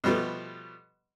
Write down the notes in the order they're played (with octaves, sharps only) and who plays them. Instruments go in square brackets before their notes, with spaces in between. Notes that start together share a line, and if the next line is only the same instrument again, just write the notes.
[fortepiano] B2 F3 G3 A3 B3